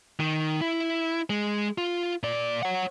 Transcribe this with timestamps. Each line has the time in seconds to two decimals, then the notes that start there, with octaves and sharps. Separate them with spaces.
0.20 D#3
0.61 E4
1.30 G#3
1.78 F4
2.23 A#2 D5
2.63 C#5 F#5